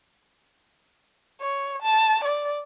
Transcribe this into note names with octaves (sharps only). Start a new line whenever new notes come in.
C#5
A5
D5